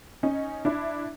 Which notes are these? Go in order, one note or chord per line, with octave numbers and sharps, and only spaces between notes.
C#4 D#4
D4 E4